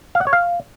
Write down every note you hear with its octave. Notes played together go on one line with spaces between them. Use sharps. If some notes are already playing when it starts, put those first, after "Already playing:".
F5
F#5
C#5
F5